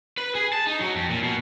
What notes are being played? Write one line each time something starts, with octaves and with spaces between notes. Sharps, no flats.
B4
G#4
A5
D#4
F#3
F2
A#2
B2